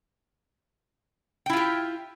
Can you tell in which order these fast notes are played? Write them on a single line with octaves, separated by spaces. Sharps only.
G5 E4 F4 G4